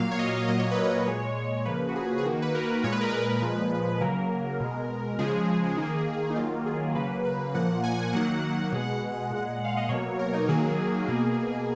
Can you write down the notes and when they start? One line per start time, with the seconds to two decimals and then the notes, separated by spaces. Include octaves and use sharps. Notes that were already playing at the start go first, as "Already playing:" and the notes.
Already playing: A#2 F#3 A#3 F5
0.11 C#5
0.19 D#5
0.48 A#2 F#3 A#3 D#5
0.59 C#5
0.71 B4
0.84 C#5
1.07 A#2 G#3
1.65 C#3 F3 A#3 B4
1.88 F#4
1.95 G#4
2.18 G#4
2.24 D#3 A#3 F#4
2.42 B4
2.55 A#4
2.84 A#2 G#3 C#5
2.92 B4
3.01 A#4
3.09 B4
3.42 A#2 F3 G#3
4.01 C#3 F#3 A#3 A#4
4.60 B2 G#3
5.18 C#3 F3 G#3 G#4
5.77 D#3
5.82 A#3
6.30 D#4
6.36 D#3 F#3 A#3 F4
6.66 G#4
6.95 C#3 F#3 A#3 B4
7.25 B4
7.54 A#2 F3 A#3 F#5
7.83 G#5
8.13 D#3 F#3 A#3 F#5
8.72 B2 G#3
9.30 A#2 G#3
9.65 F5
9.77 D#5
9.89 B2 F#3 A#3 C#5
10.19 A#4
10.34 D#4
10.48 D#3 F#3 A#3 G#4
11.07 B2 A#3